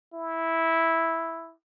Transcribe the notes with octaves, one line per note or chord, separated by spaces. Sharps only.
E4